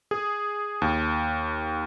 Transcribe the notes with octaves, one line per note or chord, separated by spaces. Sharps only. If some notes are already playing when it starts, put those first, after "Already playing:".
G#4
D#2